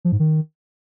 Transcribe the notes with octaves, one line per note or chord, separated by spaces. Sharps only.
F3
G#2
D#3